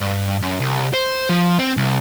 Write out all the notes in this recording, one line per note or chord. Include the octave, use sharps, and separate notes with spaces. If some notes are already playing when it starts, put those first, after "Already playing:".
G2
F#2
C2
C5
F3
C4
C2